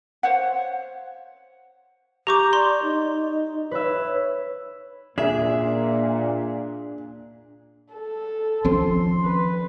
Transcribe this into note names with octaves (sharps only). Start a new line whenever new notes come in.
C5 C#5 F5 F#5
G4 A#5 C#6 D6 G6
D5 C6
D#4
B4 C#5 E5
A#2 D4 G#4 E5
A4
D#3 F3 C4 C#4 C6
B4